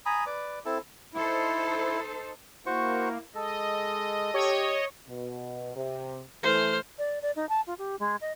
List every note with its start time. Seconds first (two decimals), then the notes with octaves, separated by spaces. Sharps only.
0.06 G#5 A#5 B5 D#6
0.27 B4 D5 D6
0.66 C4 E4 A4 A5
1.14 D#4 E4 A4 C5
2.66 A#3 E4 F#4 C5 C#6
3.35 G#3 A4 D#5
4.34 G4 C#5
5.08 B2
5.75 C3
6.43 E3 A3 C5 F6
6.98 D5
7.22 D5
7.36 D#4
7.49 A5
7.67 F4
7.78 G4
7.99 G#3
8.21 D#5